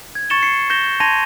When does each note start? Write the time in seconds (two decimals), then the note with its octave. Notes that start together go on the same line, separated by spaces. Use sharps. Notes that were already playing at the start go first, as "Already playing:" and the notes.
0.15 G#6
0.30 C#6 A6 C#7 E7 G7
0.43 C7 C#7
0.70 G6 A#6 E7 G7
1.00 A5 C6 G#6 A#6 D#7 F7